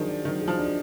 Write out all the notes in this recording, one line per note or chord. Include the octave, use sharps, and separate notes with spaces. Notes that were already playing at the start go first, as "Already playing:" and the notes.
Already playing: D#3 F3 F#3 D4 G#4
D5
D#3 F#3
G#4
F3
D4